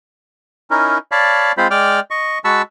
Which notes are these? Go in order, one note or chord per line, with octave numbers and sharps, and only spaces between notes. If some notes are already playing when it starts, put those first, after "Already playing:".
C#4 D#4 E4 A#4
C#5 D5 F5 A5 B5
G#3 C4 F4 C5 B5
G#3 D5 G5 D6 F6
D#5 C#6
G#3 F#4 A5 B5 C#6 E6